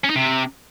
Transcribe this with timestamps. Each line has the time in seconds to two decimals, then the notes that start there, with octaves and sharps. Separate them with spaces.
0.04 C#4
0.10 D#4
0.15 C3